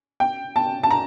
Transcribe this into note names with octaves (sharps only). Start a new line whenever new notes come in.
G5
A5
A5
A#5